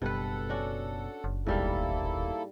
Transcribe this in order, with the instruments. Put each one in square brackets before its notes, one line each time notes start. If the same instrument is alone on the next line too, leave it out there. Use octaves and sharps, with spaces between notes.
[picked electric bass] F#1 B2 [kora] G2 B4 [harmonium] A4 F#5
[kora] C#4 D4 F#4
[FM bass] F#1
[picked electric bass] D#1 B2 [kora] G#2 G3 F5 [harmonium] A#3 E4 A4